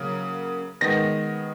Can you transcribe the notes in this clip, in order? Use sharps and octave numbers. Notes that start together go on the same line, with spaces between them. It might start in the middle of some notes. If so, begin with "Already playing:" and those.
Already playing: C#3 F#3 A#3
D#3 G#3 B3 A#6